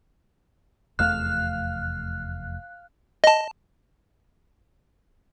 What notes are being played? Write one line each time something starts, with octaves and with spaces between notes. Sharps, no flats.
F1 E2 A3 F5 F#6
D#5 A5